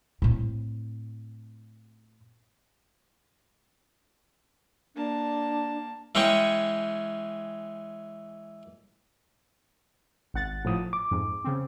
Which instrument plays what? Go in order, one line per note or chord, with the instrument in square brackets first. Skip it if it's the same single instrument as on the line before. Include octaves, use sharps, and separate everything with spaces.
[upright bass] A2 C4
[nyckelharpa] A#3 A5 [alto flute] D4
[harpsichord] E3 G#3 C#4 F#5 G5 C#6
[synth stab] G#1 F#5 A6
[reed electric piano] A2 F3 D#6
D6
[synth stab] F2 G#2
C#3 C4